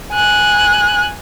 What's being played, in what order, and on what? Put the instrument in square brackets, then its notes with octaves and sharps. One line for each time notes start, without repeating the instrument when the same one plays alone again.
[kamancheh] G#5 F#6